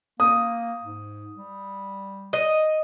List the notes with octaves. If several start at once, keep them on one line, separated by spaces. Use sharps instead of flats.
A#3 D#6
G#2
G3
D#5